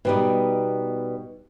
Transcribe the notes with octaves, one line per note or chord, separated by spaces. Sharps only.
B2 G3 D#4